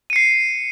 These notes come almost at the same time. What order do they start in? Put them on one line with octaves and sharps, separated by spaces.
D#7 C#7 C7